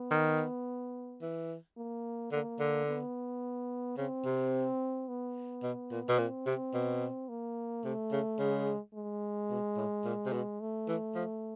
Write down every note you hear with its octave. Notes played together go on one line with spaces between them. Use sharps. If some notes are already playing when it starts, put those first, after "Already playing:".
Already playing: B3
D#3
E3
A#3
D3 A#3
D3
B3
C#3 C4
C3
B3
B2
A#2
B2
A#2 C4
C3
B2
A#3
C3 A3
C#3
C#3 G#3
G#3
B2
A2
A#2
C3
B2
A3
E3
F3